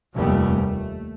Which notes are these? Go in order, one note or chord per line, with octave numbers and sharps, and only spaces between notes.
F1 D#2 G3 A3 B3
A3